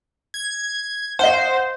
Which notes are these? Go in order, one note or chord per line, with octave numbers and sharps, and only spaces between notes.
G#6
C5 D#5 F5 F#5